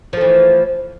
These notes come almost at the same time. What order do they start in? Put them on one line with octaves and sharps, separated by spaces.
F3 A3 E3